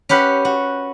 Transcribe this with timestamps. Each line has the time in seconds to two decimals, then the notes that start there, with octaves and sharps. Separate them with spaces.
0.09 C#4 G4 B4 F#5
0.45 F#4